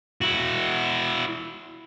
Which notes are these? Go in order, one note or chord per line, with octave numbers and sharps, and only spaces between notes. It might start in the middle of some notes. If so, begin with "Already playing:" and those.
E4 F#4